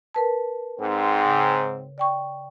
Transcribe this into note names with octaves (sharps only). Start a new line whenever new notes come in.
A#4 B4 A5
G#2 C4
C#3
D5 G5 C#6